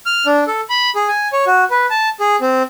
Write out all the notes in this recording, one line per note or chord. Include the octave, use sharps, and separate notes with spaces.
F6
D4
A4
B5
G#4
G#5
C#5
F#4
B4
A5
G#4
C4